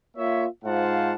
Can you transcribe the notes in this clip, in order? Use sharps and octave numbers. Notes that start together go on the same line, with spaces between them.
A#3 F4 C#5 E5
G#2 F4 C5 F5 F#5 A5